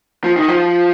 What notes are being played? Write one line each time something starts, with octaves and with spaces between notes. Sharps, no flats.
F3
D#3
F3